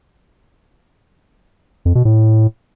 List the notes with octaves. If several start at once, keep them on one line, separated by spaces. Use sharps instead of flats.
F2
B2
A2